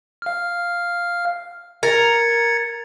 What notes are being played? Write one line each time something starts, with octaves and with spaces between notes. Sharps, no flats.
F5 F6
A#4 G#6 A6 C#7